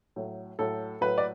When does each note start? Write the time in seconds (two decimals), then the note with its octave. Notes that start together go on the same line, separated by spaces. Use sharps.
0.16 A2 F#3
0.59 A2 F#3 A4
1.01 A2 F#3 B4
1.18 D5